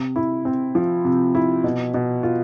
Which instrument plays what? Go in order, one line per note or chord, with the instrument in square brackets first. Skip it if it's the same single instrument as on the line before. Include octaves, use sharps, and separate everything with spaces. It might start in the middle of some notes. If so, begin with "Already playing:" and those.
Already playing: [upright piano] C3
E4
C4
F3
C3
E4
B2
B2
F4